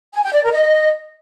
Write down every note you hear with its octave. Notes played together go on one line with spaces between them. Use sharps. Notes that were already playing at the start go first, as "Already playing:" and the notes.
G#5
G5
D5
A#4
D#5